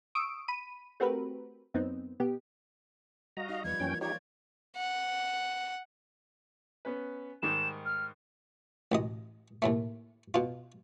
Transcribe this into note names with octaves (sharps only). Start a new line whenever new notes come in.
C#6 D#6 E6 D7
B5 D#7
A3 C4 F#4 G4 A#4 B4
F#2 B3 C4 D#4
B2 B3 G4
G3 F#4 D#5 F5 A#5
D#4 F5
E2 F3 G3 B4 G#6
F#2 E3 F3 A#3 C#4 G5
D#4 F4 G4 C#5 D5 G#6
F#5
B3 C#4 B4
G#2 D#3 G3 E7
F6
A1 D2 D#5
D#2 A2 A3
B2 F4